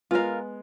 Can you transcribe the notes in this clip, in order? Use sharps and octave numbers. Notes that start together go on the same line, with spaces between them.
G#3 B3 F4 A#4 F5